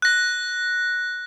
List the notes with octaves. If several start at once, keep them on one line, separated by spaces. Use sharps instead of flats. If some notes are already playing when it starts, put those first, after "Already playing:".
F#6 A#6